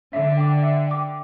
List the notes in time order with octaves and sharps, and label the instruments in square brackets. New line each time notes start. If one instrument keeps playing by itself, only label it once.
[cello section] D3 [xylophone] E5
[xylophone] G5 D6
E5
G5 D6